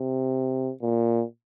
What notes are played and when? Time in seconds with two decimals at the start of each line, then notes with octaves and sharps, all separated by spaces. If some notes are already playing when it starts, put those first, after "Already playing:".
Already playing: C3
0.81 A#2